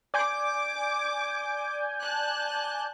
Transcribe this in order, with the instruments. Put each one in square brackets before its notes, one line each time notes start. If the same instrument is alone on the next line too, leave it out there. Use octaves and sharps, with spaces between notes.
[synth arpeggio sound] D5 G#5 G6 [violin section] D6
[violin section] A5 F#6